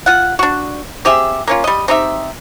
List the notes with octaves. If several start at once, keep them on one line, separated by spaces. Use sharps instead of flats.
F4 F#5
D4 F#4
C4 G4 G#4 E5
A#3 C#4 F4
G3 D#5
C4 D#4 G4 E5